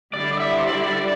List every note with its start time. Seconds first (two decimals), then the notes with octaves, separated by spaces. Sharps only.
0.14 D3 G3 E4 D5
0.33 D5
0.40 E5
0.58 C5
0.67 D5